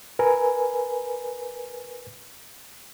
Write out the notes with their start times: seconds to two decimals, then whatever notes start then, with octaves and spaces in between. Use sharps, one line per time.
0.19 A#4 B4 G#5